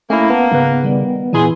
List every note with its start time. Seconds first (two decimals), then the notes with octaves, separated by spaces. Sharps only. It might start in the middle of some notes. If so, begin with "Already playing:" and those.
0.10 A3 A#3 C#4 E4
0.30 B3 A5
0.52 G#2 C#3 B4
0.84 D#3 G3
1.33 A#2 E3 E4 G#4 C6